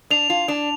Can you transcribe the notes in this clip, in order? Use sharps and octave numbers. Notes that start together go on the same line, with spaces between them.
D4 F7
F4
D4